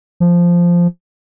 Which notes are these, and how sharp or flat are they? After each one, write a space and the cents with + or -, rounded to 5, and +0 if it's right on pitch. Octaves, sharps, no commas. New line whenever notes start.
F3 -5